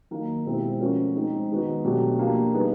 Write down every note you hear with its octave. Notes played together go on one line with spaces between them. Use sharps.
D#3 F#3 A#3 D#4
B2 G#3 C4 E4 G4
F3 A3 C#4 F#4 A#4
G#3 C4 D#4
D#3 G#3 B3 D#4 F#4
B2 F#3 A3 D4 G4
F3 A#3 D4 G4
G3 B3 D#4 G#4